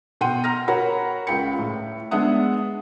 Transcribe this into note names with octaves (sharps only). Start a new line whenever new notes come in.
B2 F#5 G5 C6 D#7
A#5 F6 A#6
F#4 A#4 C#5 F#5 A#5 B5
C#2 F4 G5 B5 C#7
A2
G#3 B3 D4 E5 F#5 D#6